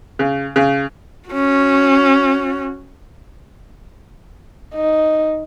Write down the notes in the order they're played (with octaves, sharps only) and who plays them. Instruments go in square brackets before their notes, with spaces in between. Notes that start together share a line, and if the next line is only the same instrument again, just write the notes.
[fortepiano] C#3
C#3
[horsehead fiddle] C#4 F#4
[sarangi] D#4